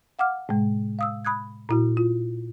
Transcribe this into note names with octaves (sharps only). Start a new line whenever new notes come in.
F5 F#5 D6 F6
A2 C3 G#3
F5 D#6 E6
B5 D#6 F#6 G#6
A#2 E4 F#4
F4